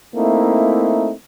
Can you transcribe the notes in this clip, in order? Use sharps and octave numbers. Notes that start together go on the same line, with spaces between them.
A3 A#3 C4 D#4 E4